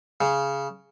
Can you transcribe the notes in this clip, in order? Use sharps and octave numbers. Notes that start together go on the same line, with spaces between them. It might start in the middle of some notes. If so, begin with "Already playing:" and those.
C#3